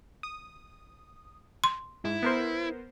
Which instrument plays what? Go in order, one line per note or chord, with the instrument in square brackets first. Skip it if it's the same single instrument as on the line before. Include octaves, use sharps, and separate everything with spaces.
[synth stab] D#6
[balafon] C6
[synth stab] G#2 [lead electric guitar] E4
[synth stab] B3 A#4 C5